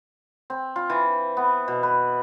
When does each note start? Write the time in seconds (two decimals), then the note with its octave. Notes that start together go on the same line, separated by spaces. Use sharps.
0.50 C4
0.76 F4
0.90 E3
1.37 B3
1.68 B2
1.83 B4